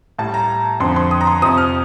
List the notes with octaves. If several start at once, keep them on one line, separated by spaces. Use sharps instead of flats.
A2 G3 A5
A#5
F2 D3 F3 C6
C6
D#6
A#5
C6
F2 C3 F3 D#6
F6